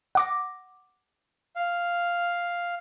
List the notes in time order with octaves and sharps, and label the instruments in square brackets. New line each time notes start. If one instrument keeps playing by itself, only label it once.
[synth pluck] F#5 D6 A#6
[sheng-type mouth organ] F5